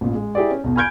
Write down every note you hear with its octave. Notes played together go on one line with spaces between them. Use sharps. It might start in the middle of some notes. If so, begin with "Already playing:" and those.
A1 A#2
G#3
E4 G4 G#4 D5
C#4
B1 E2 B2
G#5 B5 F6 G6 G#6 D7